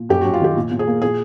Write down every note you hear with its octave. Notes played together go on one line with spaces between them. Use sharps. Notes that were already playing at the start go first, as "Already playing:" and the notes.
Already playing: A#2
F#2 G4
F#2 F#4
F4
D#3 G4
A#2
A#2
G#4
A#3
A#2 G#4